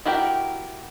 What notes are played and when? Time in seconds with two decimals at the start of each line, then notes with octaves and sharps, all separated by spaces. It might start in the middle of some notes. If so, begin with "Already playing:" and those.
0.05 E4 F#4 G4 A#4 G5